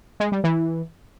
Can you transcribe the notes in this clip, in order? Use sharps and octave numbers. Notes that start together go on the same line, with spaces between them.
G#3
G3
E3